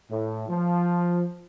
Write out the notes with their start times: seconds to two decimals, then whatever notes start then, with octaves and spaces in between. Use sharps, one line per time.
0.11 A2
0.49 F3